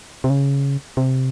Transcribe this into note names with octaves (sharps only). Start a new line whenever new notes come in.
C3
C#3
C3